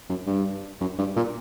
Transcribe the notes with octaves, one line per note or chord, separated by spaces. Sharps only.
F#2
G2
F#2
G2
A#2